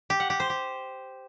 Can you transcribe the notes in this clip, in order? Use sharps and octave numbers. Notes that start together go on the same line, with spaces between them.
G4
F#5
G4
C5
G4